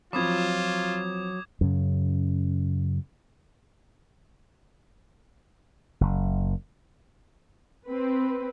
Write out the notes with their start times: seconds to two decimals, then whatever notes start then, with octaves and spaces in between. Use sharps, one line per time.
0.13 F3 F#3 C4 F4 B5 D6 D#6 G#6
1.61 F#2 C#3
6.01 F#1
7.86 C4 B4